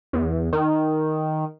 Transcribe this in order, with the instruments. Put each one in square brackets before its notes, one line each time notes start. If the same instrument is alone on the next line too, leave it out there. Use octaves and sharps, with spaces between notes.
[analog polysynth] E2
D#3